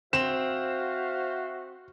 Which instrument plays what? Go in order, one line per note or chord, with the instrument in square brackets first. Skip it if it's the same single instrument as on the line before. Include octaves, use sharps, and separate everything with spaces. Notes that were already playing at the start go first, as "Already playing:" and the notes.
[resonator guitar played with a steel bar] C4 [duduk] F#4 [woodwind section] C5 E5 F5 [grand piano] E7